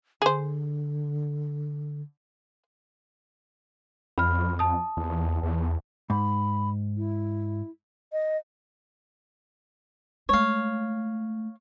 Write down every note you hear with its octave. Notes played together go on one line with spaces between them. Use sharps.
D3 G#4 C5
F2 B5 F6
A5 D#6
E2
E2
G#2 B5
E4
D#5
G#3 A3 C#5 F5